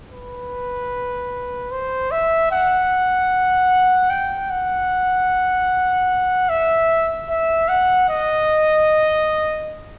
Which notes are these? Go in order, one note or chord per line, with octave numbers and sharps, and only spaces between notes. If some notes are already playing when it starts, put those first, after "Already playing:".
B4
C5
E5
F#5
G5
F#5
E5
E5
F#5
D#5